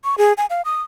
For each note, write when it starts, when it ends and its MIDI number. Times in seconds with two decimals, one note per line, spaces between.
0.04 0.15 85
0.18 0.33 68
0.38 0.46 80
0.50 0.62 77
0.65 0.82 87